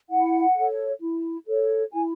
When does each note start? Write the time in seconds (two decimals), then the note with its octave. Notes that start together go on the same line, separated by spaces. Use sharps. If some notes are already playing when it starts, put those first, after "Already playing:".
0.09 E4 F#5
0.55 A4 C#5
1.01 E4
1.47 A4 C#5
1.93 E4 G#5